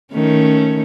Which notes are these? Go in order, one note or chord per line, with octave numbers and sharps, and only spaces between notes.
D#3 A3 C#4